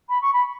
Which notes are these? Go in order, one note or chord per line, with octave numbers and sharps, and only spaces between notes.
B5
C#6
B5